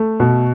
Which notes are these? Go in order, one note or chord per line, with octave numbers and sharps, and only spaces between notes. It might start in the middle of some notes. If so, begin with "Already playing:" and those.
Already playing: A3
B2